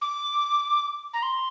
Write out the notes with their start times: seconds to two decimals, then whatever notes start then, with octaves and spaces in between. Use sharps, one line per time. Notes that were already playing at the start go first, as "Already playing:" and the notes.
0.01 D6
1.13 A#5
1.22 C6